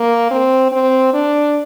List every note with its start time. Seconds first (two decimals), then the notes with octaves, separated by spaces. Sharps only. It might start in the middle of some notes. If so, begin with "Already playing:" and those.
Already playing: A#3
0.31 C4
0.72 C4
1.13 D4